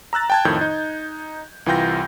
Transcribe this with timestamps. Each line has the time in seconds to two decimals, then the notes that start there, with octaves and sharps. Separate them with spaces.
0.13 A#5 E6 F#6 A6
0.30 G5 A5 G#6
0.45 F2 A2 D#3 G6
0.61 D#4
1.66 C2 E3 F4 G5 G6 A#6